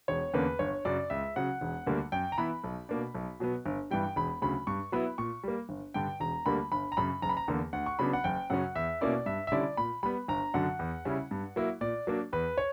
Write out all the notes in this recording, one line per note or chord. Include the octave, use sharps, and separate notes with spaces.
E1 C#5
E2 D3 A#3 C#4 B4
G1 C#5
F#2 C#3 F#3 D5
C#2 E5
C#3 F#3 F#5
E1
D2 D3 G3 A#3
F#2 G5
A#5
E3 B3 E4 B5
B1
B2 A#3 D4
B1
B2 F#3 B3
G1
G2 E3 G3 G5
E1 B5
D2 C#3 F#3 B5
G2 C#6
F#3 B3 E4 B5
A#2 C#6
G3 A#3
G1
G2 D3 G5
E1 A#5
D2 D3 G3 A#3 B5
G1 B5
A#5
F#2 C#3 B5
F#1 A#5
B5
A#5
E2 D3 A#3
D2 F#5
C#6
C#3 F#3 B3 D4 B5
F#5
F#1 G5
F#2 C#3 F#3 C#4 F#5
E2 E5
B2 A#3 C#4 E4 D5
G2 E5
E5
D3 G3 C#4 E4 D5
A#2 B5
G3 B3 B5
G1 A#5
F#2 D3 F#3 F#5
E2
C#3 G3 C#4 E4
G2
F#3 A#3 E4
A#2 D5
F#3 A#3 D4
E2 B4
C#5